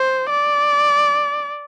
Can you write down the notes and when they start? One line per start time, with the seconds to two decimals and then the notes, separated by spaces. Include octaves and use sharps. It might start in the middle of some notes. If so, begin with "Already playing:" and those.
Already playing: C5
0.30 D5